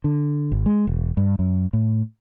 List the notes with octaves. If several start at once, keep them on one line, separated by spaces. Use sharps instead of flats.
D3
G#1
G#3
E1
G2
F#2
A2